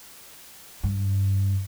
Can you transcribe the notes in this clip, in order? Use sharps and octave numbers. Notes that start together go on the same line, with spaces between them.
G2